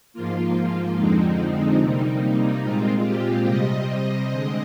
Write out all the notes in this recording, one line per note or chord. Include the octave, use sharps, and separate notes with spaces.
G#2 F3 A#3 F4
F4
F2 D3 F3 G#3 C4 D#4
C3 G3 A#3
A#2 G#3 C4 F4
G4
C3 G3 C4 D#5
D3 G#3 C4